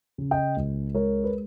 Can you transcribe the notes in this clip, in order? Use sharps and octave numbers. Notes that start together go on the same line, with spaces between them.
C#3
D#5 G5
C#2
G#3 A#4 C#5
B4